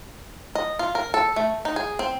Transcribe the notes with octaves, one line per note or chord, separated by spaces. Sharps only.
D#5
F4
A#4
A4
A3
D#4
G#4
C4